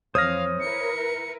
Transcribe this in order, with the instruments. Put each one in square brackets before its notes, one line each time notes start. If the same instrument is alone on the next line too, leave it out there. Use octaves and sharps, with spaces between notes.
[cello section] F2 E3 [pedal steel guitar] C5 C#5 F6 [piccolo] F5 [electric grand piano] D#6 A#6
[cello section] E4 A#4 B4 [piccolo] C#7